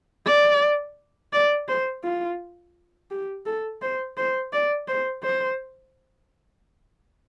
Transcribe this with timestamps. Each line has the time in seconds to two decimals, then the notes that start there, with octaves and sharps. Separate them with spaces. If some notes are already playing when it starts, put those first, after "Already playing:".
0.26 D5
1.33 D5
1.68 C5
2.04 F4
3.11 G4
3.46 A4
3.82 C5
4.17 C5
4.53 D5
4.88 C5
5.23 C5